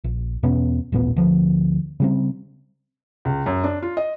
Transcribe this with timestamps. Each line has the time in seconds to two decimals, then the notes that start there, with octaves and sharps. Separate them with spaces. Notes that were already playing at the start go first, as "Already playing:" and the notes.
0.04 A#1
0.43 E2 B2 B3 C#4
0.92 D#1 A1 A#2 B3
1.16 D2 F3
2.00 C#3 G3 C4
3.25 C#2
3.46 F#2
3.64 D4
3.82 F4
3.97 D#5